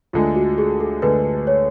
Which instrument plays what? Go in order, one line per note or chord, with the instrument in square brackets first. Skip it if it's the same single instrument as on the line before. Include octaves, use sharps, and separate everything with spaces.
[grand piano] D2 D3 G#3 [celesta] F4
[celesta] F#4
G#4
A4
[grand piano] D2 D3 G#3 [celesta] B4
[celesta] C#5